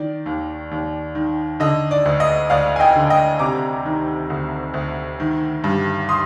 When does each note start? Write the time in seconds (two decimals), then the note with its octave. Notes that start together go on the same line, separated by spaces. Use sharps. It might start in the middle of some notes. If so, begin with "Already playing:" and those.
Already playing: D#3 D5
0.26 D#2
0.71 D#2
1.15 D#3
1.60 D3 D#5
1.91 D5
2.05 D2
2.20 D#5
2.50 D2 D5 F5
2.76 G#5
2.80 D#5 G5
2.96 D3
3.10 D#5 G5
3.39 C3 A#5 D6
3.85 D#3
4.30 D2
4.74 D2
5.20 D#3
5.64 G2
6.09 C6 D#6